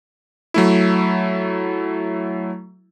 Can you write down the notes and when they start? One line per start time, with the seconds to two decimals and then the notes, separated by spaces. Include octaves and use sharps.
0.54 F#3 A3 E4